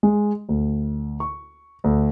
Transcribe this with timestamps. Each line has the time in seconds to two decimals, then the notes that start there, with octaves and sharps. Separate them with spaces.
0.03 G#3
0.49 D2
1.20 C#6
1.84 D2